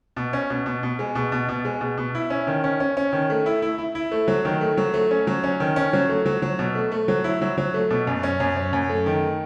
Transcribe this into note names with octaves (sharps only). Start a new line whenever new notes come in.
B2
C#4
B2
B2
B2
G#3
B2
B2
B2
G#3
B2
B2
E4
C#4
D#3
C#4
C#4
C#4
D#3
A3
E4
E4
E4
E4
A3
F#3
D#3
A3
F#3
A3
C#4
F#3
C#4
D#3
C#4
F#3
A3
F#3
F#3
B2
A3
A3
F#3
E4
F#3
F#3
A3
B2
F#2
C#4
F#2
C#4
F#2
A3
D#3